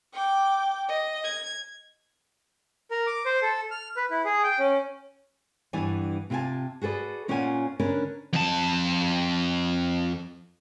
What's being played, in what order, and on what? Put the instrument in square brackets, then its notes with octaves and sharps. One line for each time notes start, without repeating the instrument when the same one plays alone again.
[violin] G5 D6
D#5
G#6
[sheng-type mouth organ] A#4
D6
C5
A4
F6
B4
E4
G#4
G5
C#4
[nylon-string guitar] G2 E3 B3 D5 G#5
C3 E4 F4 G4 G#5 A5
F#4 G#4 A4 B4 D5
A#2 C#4 F4 D5 F#5 G#5
D3 C#4 D4 A#4 B4
[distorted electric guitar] F2 A5